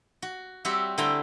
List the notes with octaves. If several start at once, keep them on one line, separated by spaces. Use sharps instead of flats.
F#4
G3 C4 F#4 G4 C#5 E5
D3 A3 E4 C5 G5 A#5